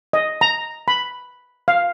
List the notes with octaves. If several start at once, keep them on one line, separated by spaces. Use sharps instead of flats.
D#5
A#5
B5
F5